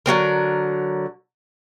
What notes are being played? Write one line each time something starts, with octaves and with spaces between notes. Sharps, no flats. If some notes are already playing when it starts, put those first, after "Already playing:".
D3 F#3 C4 A#4